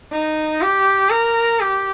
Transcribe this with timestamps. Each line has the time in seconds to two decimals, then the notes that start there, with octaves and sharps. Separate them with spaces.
0.12 D#4
0.61 G4
1.10 A#4
1.60 G4